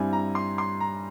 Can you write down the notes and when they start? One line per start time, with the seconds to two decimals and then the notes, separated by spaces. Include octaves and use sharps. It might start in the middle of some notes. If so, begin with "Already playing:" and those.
Already playing: G2 G3 C4 E4 G#5
0.13 A#5
0.35 C6
0.58 C6
0.81 A#5